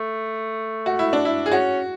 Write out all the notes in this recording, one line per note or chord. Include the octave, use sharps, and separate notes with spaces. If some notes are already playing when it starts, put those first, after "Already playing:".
Already playing: A3
F#4
E4
D4
E4
G#4
C#4 F#4